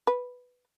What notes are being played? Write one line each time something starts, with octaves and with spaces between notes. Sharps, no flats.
B4